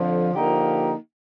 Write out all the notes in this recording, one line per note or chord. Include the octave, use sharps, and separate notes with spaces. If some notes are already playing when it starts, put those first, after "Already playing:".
Already playing: F2 D3 F3
D3 F3 A#3 D#4 G4